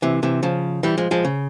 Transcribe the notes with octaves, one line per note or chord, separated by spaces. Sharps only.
C3 E3
C3 E3
C#3 F3
E3 G3
F3 G#3
F3 G#3
C#3